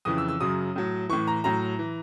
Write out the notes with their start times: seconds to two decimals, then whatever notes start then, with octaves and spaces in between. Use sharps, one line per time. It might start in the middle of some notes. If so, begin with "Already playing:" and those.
0.05 F2 C#3 E3 D#6
0.18 E6
0.28 E6
0.40 F#2 C#3 F#3 D#6
0.76 A2 F#3
1.09 A2 E3 C#6
1.27 A#5
1.44 A2 F#3 A#5
1.79 E3